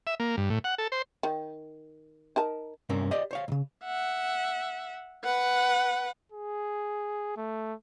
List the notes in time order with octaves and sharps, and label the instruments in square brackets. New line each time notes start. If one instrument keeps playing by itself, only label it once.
[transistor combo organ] E5
A#3
G2
A2
F#5
A4
C5
[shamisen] D#3
D#4 A#4 A5
[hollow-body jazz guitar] G2 C3 C4 C#4 A#4
G4 C5 D5 D#5
C5 C#5 F5
B1 C#3
[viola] E5 F#5
B4 F#5
[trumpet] G#4
A3